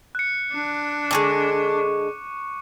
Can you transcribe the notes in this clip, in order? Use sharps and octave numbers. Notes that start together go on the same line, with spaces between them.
F#6 C#7
D4
D3 F#3 G#3 C#6 D6